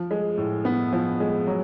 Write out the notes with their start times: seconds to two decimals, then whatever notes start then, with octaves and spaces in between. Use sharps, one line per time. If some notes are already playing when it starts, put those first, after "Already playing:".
Already playing: F3
0.11 G#3
0.37 A2
0.65 B3
0.93 F3
1.20 G#3
1.47 F#3